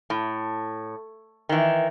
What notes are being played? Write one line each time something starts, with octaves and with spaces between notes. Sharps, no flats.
A2
D#3 E3